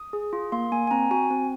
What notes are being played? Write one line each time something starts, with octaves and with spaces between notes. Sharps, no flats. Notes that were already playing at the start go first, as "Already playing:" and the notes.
Already playing: D#6
G#4
F4
A#3 C6
A#3 G#5
G#5
C4 A#5
F#4 G#5
C4